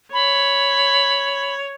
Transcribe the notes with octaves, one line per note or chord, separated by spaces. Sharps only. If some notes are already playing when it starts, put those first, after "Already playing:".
C#5 B5